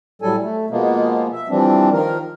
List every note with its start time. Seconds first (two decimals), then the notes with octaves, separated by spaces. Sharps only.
0.22 A2 F#3 G3 A4 G#5
0.42 A3
0.70 B2 F3 G#3 A#3 B3
1.32 E5
1.49 E3 F3 G3 C4 D4
1.93 D#3 F3 A#4